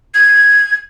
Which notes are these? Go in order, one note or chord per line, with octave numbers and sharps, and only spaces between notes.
G#6